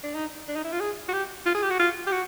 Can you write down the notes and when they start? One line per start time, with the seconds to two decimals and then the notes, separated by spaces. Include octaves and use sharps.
0.03 D4
0.15 D#4
0.48 D4
0.56 D#4
0.64 E4
0.72 F4
0.80 G#4
1.08 F#4
1.13 G4
1.46 F4
1.55 G#4
1.63 G4
1.70 F#4
1.79 F4
2.07 G4
2.12 F#4